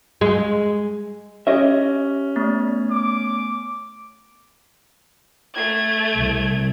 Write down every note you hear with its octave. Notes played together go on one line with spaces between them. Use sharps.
G#3
C#4 G4 D#5 E5
A3 B3
D6
A3 G#6
C2